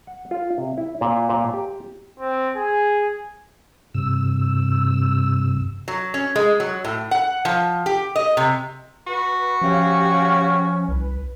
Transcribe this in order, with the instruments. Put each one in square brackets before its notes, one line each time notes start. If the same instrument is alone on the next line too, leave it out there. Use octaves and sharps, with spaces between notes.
[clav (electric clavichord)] F#5
F4
C3
E4
A#2
A#2
G4
[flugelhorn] C4
G#4
[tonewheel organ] G2 C3 E6
[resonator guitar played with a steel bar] F#3
C#4
G#3
F#3
A2
F#5
F3
G4
D#5
C3
[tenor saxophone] F#4 [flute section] B4
[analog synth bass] F3 [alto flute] C#4 [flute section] G4 F5
[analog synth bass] C2 [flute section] B4